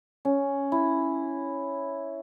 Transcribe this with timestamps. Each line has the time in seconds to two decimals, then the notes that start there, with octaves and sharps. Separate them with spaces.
0.25 C#4
0.72 E4